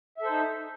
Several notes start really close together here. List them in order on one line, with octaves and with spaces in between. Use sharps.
E5 A4 C5 D#4